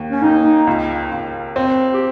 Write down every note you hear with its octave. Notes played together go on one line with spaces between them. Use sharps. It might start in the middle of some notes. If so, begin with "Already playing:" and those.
Already playing: D#2
C#4
D#2 D#4
C#2
C#2
C4
G4